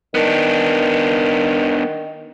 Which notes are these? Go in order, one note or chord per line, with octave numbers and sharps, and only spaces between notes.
D#3 B3 D4